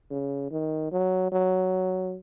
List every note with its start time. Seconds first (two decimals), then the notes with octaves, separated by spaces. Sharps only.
0.10 C#3
0.51 D#3
0.92 F#3
1.32 F#3